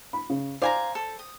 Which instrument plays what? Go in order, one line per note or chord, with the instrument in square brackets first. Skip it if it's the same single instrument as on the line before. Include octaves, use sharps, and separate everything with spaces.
[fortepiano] B5
C#3
[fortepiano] C5 D5 D6 [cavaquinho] F5 G#5 A#5
[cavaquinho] A4
D#6